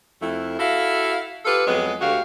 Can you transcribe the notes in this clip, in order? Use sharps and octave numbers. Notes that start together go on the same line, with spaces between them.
F2 A3 E4
E4 F#4 A4 F5
F4 G4 A4 B4
F2 F#3 G#3 B3 B4
D2 D3 F#4 G4 F5